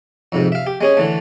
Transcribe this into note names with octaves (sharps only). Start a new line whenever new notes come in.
F2 G#2 C3
E5 F5
G4
G#3 C#4 G#4
D3 E3 A3